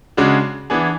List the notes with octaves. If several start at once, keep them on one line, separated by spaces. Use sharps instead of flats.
C#3 G#3 D4 F#4
E3 B3 D4 G#4